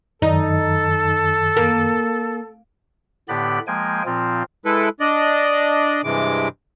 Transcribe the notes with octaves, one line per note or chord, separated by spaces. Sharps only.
F#2 D#3 D#4 A4
A#3
A2 D3 B3 G4 D5 B5
F3 G#3 A#3 G5 G#5
A#2 F3 C4 F4
G#3 E4 A4 B4
D4 D5 D#5
G2 C3 E3 G#3 D6